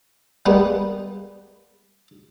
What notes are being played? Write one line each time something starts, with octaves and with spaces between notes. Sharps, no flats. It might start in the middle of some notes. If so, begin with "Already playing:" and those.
G3 G#3 A#3 B3